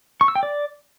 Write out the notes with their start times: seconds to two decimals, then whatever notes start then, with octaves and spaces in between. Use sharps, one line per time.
0.21 C#6
0.28 E6
0.35 G5
0.43 D5